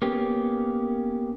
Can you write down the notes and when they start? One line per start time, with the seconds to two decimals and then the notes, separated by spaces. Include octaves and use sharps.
0.02 A#3 B3 C#4 G4